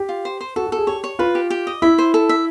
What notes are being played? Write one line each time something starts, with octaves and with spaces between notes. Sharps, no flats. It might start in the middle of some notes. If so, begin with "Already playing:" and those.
Already playing: G4
F4
C5
C5
F#4 A4
F#4
G#4 A4
G4 C#5
C#5
F4 B4
G4
G4
D#5
E4 E5
C5
A4
E5